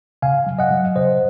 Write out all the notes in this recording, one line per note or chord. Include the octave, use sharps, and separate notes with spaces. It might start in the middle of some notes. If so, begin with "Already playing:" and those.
C#3 F5 G#5
F#3
D#5 F#5
F#3
C#3 C5 D#5